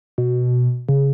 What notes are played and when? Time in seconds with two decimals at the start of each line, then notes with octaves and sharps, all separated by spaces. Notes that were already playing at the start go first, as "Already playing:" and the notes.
0.18 B2
0.89 C#3